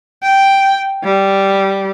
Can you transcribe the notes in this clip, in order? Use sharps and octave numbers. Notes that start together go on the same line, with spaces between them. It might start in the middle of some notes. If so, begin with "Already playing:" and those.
G5
G3